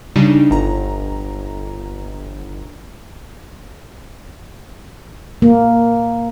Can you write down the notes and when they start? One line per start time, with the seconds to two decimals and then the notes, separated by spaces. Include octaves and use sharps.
0.16 C#3 G3 D4 D#4
0.51 G1 A#5
5.42 A#3